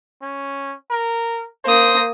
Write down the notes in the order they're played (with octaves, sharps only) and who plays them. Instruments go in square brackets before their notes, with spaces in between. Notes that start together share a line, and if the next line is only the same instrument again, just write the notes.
[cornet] C#4
A#4
[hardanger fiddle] A#3 D#6 [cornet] C5